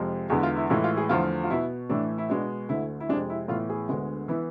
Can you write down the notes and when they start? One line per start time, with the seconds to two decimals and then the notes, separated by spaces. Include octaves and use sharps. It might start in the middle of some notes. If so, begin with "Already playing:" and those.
Already playing: F2 C3 F3 G#3
0.30 E2 D3 G#3 B3 G#4
0.43 F4
0.56 E4
0.70 A2 E3 G#3 F4
0.84 F4
0.97 G#4
1.09 E2 D3 F3 A3 F4
1.44 F4
1.50 B2 B3 E4
1.89 A2 E3 A3 D4
2.18 E4
2.29 B2 G#3 B3 D4
2.69 D2 D3 A3 E4
3.00 E4
3.09 F2 C3 G#3 D4
3.30 E4
3.48 A2 E3 B3 F4
3.70 G#4
3.88 D2 D3 G#3 B3
4.28 E3 B3 E4